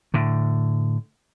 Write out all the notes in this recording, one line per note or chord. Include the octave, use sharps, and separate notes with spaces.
A2 D3